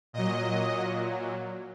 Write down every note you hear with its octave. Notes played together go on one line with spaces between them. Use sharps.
A#2 F#3 D#5